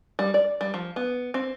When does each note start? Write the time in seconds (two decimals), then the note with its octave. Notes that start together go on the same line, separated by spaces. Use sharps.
0.19 G3
0.34 D5
0.61 G3
0.74 F3
0.96 B3
1.34 C4